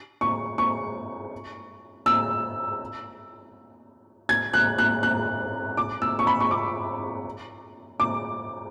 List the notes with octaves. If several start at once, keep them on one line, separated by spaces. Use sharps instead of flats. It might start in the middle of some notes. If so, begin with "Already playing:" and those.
C#6
C#6
E6
G#6
F#6
F#6
F#6
D6
E6
C#6
B5
C#6
D6
D6